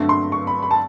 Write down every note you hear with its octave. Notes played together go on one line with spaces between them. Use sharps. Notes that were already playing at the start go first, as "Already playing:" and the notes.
Already playing: G2 D3 F#3 A3 C4
C6
C#6
B5
B5
A5